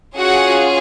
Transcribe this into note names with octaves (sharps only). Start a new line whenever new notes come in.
C#4 F4 F#4 G#4 F#5